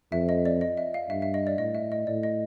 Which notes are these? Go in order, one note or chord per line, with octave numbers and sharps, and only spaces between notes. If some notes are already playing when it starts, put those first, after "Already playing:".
F2 E5
D#5
D5
D#5
E5
F5
G2 E5
E5
D#5
D5
A2 D#5
E5
D#5
A2 D5
D#5